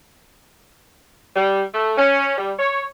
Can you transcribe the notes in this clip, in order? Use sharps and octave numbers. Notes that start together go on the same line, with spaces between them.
G3
A3
C#4
G3
C#5